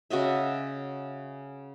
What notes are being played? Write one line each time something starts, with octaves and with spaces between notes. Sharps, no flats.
C#3 F#4 D#5 E5